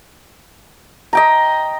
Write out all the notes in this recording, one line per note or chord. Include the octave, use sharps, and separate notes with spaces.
D#5 G5 A#5